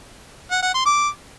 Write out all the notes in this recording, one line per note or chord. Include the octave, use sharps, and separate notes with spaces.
F#5
F#5
C6
D6